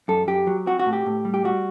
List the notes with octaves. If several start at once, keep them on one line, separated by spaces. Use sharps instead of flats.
F#2 A4
F#2 G4
F#3
C4 F#4
F#4
A2
G4
A2
G3
G4
G3 F#4